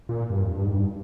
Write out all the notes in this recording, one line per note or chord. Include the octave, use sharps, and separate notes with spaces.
A#2
G2
F2
G2
G#2
G2